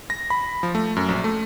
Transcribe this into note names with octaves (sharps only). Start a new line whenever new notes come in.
A#6
B5
F3
A3
F#2
A#1
A3